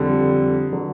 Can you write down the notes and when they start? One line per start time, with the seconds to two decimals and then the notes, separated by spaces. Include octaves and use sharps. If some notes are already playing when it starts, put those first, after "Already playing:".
Already playing: F2 D3 G3
0.72 D3 F#3